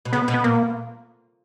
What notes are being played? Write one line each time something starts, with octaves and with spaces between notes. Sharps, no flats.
B2
C#3 B3
B2
B3
A#2 A#3